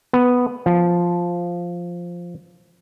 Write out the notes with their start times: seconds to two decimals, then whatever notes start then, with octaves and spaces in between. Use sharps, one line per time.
0.13 B3
0.66 F3